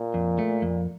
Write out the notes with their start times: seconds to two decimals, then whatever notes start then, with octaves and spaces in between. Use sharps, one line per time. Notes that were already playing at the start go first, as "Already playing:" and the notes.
Already playing: A#2
0.14 F2
0.39 A3
0.62 F2